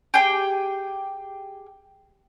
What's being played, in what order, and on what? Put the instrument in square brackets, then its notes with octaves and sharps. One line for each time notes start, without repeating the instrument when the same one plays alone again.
[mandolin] G4 G#4 G5